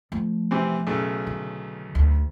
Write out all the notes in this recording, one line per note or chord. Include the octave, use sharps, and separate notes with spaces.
F3 A3
C3 E3 C4
B1 C#3 A3
D3
D2